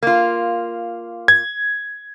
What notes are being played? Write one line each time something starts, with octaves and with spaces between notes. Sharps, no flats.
A#3 F4
G#6